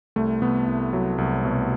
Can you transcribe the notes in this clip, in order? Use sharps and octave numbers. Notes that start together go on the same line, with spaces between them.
C2 A3
C2 B3
C2
F#3
C2
B2